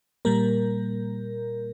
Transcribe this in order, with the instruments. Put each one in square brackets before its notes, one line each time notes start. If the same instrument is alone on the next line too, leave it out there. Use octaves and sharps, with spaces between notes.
[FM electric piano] A#2 G3 A#3 A#4